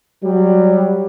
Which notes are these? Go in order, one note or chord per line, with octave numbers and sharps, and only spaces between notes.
F#3 G3